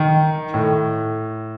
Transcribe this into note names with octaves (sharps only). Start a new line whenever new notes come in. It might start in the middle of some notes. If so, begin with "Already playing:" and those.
Already playing: D#3
A2